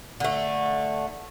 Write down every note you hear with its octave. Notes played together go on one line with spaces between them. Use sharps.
D3 A3